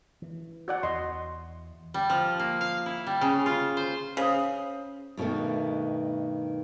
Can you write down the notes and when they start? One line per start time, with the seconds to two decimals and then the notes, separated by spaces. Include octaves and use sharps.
0.22 E3
0.68 F#4 D5 F#5
0.83 E2 D#5 C6
1.94 G3
2.10 F3
2.39 A#3
2.61 F5
2.86 E4
3.07 G3
3.21 C#3
3.46 F4
3.77 C5
4.17 C#3 C5 D#6
5.17 G2 B2 D3 D#3 A3